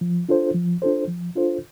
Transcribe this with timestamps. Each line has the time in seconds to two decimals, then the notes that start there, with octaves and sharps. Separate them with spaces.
0.01 F3
0.29 D4 F4 A4 C5
0.55 F3
0.82 D4 F4 A4 C5
1.08 F3
1.35 D4 F4 A4 C5